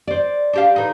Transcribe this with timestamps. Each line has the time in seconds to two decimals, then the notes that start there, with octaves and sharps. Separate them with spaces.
0.07 C5 D5
0.53 D4 G4 F5
0.76 D3 E3 D#4